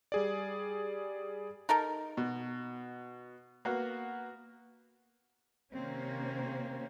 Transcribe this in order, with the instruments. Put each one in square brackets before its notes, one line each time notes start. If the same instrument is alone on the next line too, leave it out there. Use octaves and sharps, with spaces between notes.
[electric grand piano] G3 G#4 D5
[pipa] D#4 A4 A#4
[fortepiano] B2
A#3 B3 F#4
[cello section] C3 D#3 A#3 C4 C#4